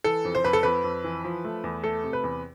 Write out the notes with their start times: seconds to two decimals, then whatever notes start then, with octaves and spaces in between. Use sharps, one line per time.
0.04 E3 A4
0.25 F2
0.35 C5
0.44 F2 B4
0.53 A4
0.63 F2 B4
0.84 F2
1.04 E3
1.25 F3
1.45 A3
1.64 E2
1.84 A3 A4
2.04 C3
2.13 B4
2.24 E2